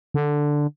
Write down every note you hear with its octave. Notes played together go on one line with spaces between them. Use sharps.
D3